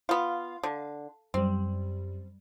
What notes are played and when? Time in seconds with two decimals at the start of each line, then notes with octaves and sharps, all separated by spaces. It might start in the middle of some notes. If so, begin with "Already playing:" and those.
0.09 B3 F4 F5
0.63 D3
1.34 F#2 G3 C4